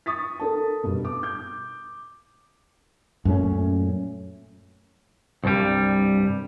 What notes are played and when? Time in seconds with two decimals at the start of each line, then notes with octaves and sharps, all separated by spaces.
0.06 C#6 D#6 A6 B6
0.39 A4 A#4 A5
0.83 G2 B2
1.05 D6
1.23 G6
3.25 F#2 A#2 A3 C#4
5.44 C2 G2 G3